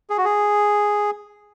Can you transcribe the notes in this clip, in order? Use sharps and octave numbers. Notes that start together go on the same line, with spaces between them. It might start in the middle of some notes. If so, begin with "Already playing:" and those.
G#4
F#4
G#4